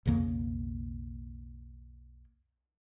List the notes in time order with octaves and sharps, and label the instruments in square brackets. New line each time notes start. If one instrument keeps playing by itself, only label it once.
[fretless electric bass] B1 F2 C#3 A#3